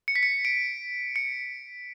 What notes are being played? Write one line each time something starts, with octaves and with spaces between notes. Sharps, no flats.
C#7
B6
C#7
D7
C#7